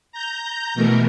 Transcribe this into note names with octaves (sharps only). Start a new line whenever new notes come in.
A#5 G6
B2 E3 A3 A#4